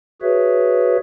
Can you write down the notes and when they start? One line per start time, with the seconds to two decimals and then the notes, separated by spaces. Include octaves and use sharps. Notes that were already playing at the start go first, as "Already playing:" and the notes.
0.22 F#4 G#4 B4 C#5 E5